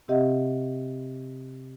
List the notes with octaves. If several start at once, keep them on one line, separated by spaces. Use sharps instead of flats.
C3 C4 G4 D#5 E5 F#5